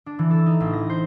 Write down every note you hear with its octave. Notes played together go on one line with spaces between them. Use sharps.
D4
E3
A4
D#4
A1
A#6
C5